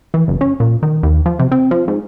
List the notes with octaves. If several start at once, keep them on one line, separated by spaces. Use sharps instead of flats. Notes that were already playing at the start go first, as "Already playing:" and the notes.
E3
F#1
C#4
A#2
D#3
D#2
F3
C3
C4
F3
G#2